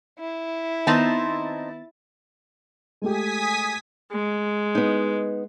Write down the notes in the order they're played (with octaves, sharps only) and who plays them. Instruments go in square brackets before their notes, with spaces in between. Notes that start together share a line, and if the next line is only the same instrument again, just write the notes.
[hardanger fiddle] E4
[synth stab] D#3 B3 A6 [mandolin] C4 D#4 A5
[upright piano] G#3 A3 G4 [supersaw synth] G#5 D#6 B6
[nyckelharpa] G#3
[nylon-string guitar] B3 D#4